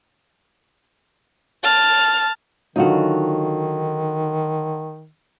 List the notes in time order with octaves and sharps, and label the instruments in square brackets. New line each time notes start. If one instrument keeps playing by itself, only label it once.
[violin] A5 F6
[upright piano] D3 F#3 [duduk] D#3 [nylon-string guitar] D#4 F4 F#4